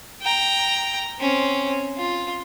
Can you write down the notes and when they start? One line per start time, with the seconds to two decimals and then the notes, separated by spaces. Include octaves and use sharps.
0.22 G5 A#5
1.19 C4 C#4
1.97 F4